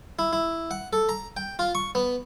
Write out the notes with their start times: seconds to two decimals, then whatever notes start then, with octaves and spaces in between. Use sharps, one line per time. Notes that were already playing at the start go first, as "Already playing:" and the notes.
0.19 E4
0.33 E4
0.71 F#5
0.93 A4
1.09 A#5
1.37 G5
1.59 F4
1.75 C#6
1.95 B3